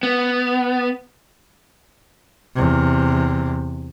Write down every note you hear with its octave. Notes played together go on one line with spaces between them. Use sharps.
B3
E2 C3